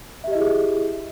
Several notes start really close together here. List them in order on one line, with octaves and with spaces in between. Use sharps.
E5 G4 D#5 E4 G#4